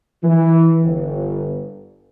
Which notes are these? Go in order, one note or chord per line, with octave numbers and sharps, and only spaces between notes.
E3
G1